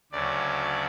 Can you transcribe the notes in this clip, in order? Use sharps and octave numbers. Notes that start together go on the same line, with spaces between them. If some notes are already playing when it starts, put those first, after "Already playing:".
D2 C#3 F#3 D5